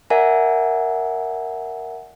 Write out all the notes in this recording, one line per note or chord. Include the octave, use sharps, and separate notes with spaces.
A#4 D5 E5 F#5 G#5